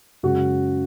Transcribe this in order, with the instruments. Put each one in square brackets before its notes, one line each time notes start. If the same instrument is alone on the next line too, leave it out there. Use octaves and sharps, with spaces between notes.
[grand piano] F#2 C#3 G#3 F#4